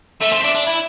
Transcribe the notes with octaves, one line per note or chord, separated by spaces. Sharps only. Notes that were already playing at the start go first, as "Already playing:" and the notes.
A3 E5
C4
D4
D4
E4